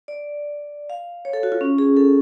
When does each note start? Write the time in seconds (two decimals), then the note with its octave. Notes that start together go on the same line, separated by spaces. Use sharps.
0.08 D5
0.90 F5
1.25 C#5
1.33 A4
1.43 F#4
1.52 F4
1.61 C#4
1.78 G#4
1.97 A4